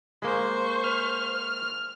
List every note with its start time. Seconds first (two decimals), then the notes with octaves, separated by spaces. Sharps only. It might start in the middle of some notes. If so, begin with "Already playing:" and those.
0.22 G#3 A#3 C5 C#6
0.84 F6